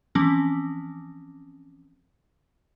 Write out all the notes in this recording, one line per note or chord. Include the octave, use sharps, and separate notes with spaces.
E3 F3 C4 C#4